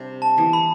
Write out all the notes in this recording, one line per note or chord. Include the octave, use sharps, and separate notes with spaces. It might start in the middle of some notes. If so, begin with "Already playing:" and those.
Already playing: C3 G3 D4
A5
E3 B3
B5